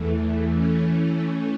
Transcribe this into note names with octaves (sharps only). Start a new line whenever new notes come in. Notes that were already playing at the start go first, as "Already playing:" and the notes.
Already playing: E2 E3 A3
E3 A3 C#4